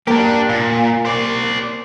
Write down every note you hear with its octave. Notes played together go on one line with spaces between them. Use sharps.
A#3 D4 G4 A#4
A#2
C5 D5